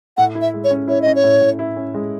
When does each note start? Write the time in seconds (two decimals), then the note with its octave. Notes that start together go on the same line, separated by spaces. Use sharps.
0.17 A2 F#5
0.35 E4
0.41 E5
0.54 G#3
0.64 C#5
0.71 C#4
0.88 E4 C#5
1.02 C#4 D#5
1.15 C#5
1.24 A2
1.41 A2
1.59 E4
1.76 C#4
1.94 G#3